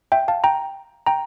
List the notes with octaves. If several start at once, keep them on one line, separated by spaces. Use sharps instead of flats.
E5 G5
F5 A5
G5 A#5
G5 A#5